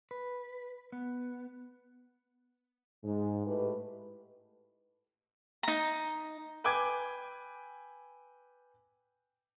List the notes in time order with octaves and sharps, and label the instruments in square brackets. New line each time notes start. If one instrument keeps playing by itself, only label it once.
[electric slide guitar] B4
B3
[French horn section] G#2
A2 G#3 G4 B4
[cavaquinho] D#4 A#5
[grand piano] B4 G5 G#5 D6 G#6